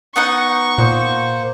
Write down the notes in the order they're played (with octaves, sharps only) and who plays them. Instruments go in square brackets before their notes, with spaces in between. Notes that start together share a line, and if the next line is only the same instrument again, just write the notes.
[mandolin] B3 D#4 F#5 [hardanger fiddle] C#6
[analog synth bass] A#2 [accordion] A#3 C5